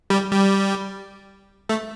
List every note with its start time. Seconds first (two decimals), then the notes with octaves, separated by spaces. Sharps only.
0.10 G3
0.33 G3
1.69 A3